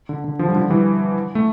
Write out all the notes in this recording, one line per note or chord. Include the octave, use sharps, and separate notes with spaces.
D3
D3
D3 F3
G3
D3 F3
E3 G3
A3